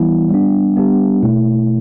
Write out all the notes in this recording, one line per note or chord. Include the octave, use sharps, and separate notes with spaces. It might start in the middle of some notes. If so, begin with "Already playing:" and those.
Already playing: E3 G3 B3 E4
G3 B3 D4
G3 B3 D4 G4
B2 A3 E4